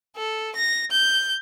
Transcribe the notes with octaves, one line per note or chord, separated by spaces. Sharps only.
A4
A#6
G6